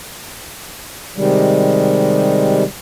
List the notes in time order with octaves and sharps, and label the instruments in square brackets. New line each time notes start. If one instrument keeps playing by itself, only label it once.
[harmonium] C3 D#3 G3 G#3